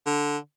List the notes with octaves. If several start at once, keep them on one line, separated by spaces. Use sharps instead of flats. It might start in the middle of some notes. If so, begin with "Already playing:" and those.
D3